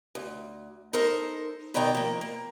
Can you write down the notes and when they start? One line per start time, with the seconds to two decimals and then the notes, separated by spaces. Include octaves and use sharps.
0.15 D2
0.93 D#4 A4 A#4 C5
1.74 B2 D#3 A#3 D5 G5 A#5
1.95 F3 A#3
2.21 A#3